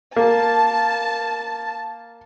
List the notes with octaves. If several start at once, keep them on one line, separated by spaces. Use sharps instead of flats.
A#3 A5